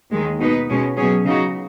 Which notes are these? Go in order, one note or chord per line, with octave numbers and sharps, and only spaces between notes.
D#2 D#3 G#3
B2 B3 D#4 B4
B2 G#3 C#4
B2 F#3 C#4 G#4
C#3 F#3 D#4 F#4